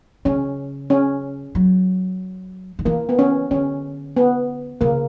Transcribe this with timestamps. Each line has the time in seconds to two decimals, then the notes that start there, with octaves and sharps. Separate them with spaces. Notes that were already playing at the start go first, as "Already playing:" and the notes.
0.25 C#3 C#4
0.90 C#4
1.55 F#3
2.79 D3
2.85 E3 A#3
3.09 B3
3.19 C#4
3.51 D3 C#4
4.17 B3
4.81 C#3 A#3